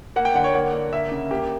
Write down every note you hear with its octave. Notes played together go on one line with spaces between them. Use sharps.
A#3 F#5
G5
D3 F#5
C#5
A#3 F#5
D3
A#3 E5
C#3
A#3 G4